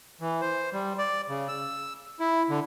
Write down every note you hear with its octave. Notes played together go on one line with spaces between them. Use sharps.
E3
C5
G3
D5
C#3
E6
E4
D3